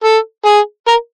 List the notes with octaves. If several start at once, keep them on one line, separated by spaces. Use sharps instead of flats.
A4
G#4
A#4